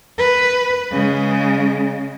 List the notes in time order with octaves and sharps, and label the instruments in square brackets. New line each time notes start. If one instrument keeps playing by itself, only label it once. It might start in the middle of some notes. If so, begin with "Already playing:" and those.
[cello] B4
C#3 G#3